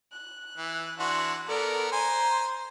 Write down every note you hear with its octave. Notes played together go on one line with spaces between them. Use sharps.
F#6
E3
E3 D4 F#4 C6
B3 A4 A#4 D5
C5 G#5 A#5 C6